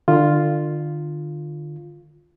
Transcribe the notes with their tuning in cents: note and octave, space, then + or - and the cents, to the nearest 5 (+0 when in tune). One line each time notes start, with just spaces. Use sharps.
D3 +35 F4 +0